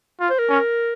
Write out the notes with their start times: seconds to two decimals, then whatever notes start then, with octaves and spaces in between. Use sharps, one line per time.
0.20 F4
0.30 C5
0.39 A#4
0.49 C#4